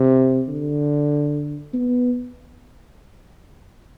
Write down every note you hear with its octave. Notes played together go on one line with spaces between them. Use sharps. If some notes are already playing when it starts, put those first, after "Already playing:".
Already playing: C3
D3
B3